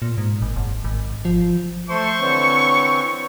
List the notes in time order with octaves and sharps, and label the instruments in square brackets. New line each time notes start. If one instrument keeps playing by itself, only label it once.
[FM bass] A#2
G#2
G#1
F#1
G#1
F3
[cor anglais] A3 [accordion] C5 C6 [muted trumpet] C#6
[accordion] D3 E3 C4 [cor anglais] C#5